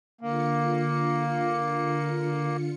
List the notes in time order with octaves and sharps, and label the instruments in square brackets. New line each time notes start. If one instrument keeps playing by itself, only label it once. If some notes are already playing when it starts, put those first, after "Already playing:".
[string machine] D3 F4 C#7 [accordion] A#3